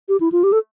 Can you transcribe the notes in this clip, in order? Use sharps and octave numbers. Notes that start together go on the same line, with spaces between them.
G4
E4
F4
G4
A4